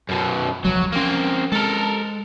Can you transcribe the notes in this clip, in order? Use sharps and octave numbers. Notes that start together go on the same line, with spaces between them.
F#2 B2
E1 C#2 F3 F#3
F3 A#3 C4 C#4
G#3 A4 A#4